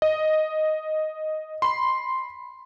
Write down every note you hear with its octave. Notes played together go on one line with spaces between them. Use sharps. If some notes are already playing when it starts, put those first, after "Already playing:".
D#5
B5 C6